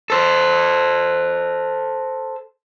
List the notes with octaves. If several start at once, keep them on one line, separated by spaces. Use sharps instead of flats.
A4 C5